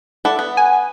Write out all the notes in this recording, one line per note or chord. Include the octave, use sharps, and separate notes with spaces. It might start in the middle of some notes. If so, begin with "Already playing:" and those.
E4 A4 D5 F#5
B3
G#5